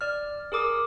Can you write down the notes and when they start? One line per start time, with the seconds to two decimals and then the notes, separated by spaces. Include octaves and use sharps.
0.01 D5 F6
0.52 G#4 A#4 D6 D#6